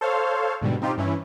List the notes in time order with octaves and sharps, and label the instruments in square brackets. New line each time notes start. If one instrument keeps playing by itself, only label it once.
[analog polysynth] A4 C5 C#5 F5
G#2 B2 D3 G3
C4 D#4 F4 G4
G2 E3 C#4 E4